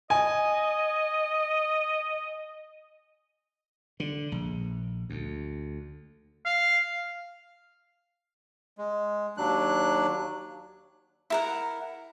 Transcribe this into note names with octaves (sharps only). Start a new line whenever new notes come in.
D#5 G#5
D3
A#1
D2
F5
G#3
D#2 F#3 D4 F#6
E4 A#4 F#5